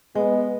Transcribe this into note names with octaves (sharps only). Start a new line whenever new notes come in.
G#3 B3